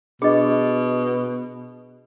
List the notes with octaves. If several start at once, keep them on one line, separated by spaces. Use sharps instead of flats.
B2 D4 G#4 D#5